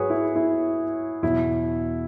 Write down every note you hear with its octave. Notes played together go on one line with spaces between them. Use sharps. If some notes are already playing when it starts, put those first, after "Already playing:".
Already playing: G#2 F#3 F#4 G#4 B4 C#5
E4
E4
E2 B2 F#3 E4